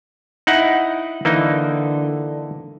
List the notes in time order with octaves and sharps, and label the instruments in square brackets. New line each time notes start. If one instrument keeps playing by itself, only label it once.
[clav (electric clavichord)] D#4 E4 F#5
[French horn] D3 [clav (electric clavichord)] E3 A#3 D#4